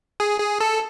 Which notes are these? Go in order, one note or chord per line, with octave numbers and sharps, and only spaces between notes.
G#4
G#4
A4